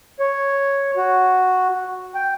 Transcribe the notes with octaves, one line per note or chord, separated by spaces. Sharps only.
C#5
F#4
G5